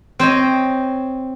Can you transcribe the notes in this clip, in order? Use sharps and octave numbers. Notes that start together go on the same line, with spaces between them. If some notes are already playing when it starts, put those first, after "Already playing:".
C4 C5 C#5 D#5